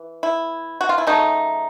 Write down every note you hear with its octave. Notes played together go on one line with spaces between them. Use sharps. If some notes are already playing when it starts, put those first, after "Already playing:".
Already playing: E3
E4
F#4
F4
E4
C#3 F#3 A3 D#4